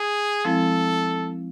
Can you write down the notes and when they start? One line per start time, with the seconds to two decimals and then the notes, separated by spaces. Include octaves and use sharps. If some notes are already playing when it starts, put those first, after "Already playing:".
Already playing: G#4
0.45 F3 G#3 C4 E4 A4